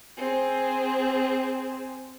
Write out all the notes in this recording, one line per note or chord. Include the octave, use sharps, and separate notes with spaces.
C4 G#4